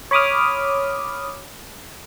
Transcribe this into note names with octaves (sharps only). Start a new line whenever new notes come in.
C#5 B5 D6 D#6 F6